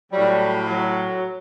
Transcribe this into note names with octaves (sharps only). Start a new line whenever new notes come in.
A2 F#3 G3
F#3